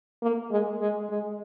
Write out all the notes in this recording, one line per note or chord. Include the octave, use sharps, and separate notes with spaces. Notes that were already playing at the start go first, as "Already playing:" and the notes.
A#3
G#3
G#3
G#3